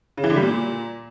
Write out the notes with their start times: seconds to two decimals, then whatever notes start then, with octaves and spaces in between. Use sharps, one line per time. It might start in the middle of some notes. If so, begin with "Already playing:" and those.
0.17 C#3
0.24 E3
0.30 D3
0.36 G3
0.42 A#2